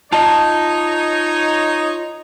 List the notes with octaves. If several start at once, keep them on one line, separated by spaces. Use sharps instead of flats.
D#4 F4 C#5 D#5 A5